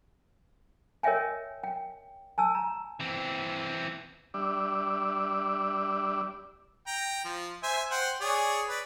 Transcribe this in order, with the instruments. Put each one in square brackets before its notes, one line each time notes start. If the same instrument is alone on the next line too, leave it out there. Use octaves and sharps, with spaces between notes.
[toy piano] A#4 C#5 D#5 E5 G5 G#5
G5
G#5 A5 E6
A#5
[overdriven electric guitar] E3 C4
[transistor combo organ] G3 D4 D5 E5
[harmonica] G5 A#5
F3
C5 E5 G#5
C5 F#5 G5
G#4 C#5 D5
B4 D5